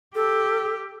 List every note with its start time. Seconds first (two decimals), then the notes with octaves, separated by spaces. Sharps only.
0.15 G4 A4